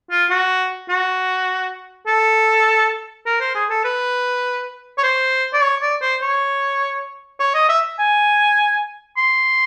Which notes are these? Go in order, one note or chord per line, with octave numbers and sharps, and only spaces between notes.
F4
F#4
F#4
A4
A#4
C5
G#4
A4
B4
C#5
C5
D5
C#5
D5
C5
C#5
C#5
D#5
E5
G#5
C6